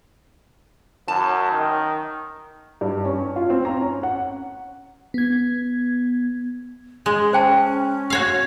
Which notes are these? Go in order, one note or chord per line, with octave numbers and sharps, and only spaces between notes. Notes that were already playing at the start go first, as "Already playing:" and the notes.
F#2 A5
D#3
G2
C#4
F4
C4
A#5
C#4
F#5
B3 G#6
G#3 G#4
C#4 C5 G5 A5
F#4 C#5 F5